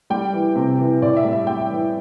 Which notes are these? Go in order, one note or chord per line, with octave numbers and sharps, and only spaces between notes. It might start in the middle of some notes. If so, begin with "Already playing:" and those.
G3 G5
E3
C3
E3
A2 D5
E5
G3
E5
G3 G5
E3